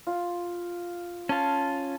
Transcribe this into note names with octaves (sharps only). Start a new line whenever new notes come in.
F4
C#4 F4 A5